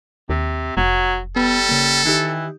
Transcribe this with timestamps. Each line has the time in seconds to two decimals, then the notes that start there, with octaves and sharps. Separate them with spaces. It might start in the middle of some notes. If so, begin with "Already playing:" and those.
0.29 D#2 C3
0.77 F1 F#3
1.36 G3 B3 A4
1.69 C#3 A#3
2.05 D#3 E3 D#4 G4